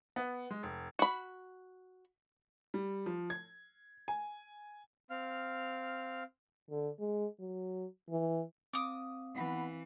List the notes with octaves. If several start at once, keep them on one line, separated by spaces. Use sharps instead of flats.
B3
G#3
F1
F#4 B5
G3
F3
G#6
G#5
C4 F5 F6
D3
G#3
F#3
E3
C4 F5 D6 D#6
E3 B3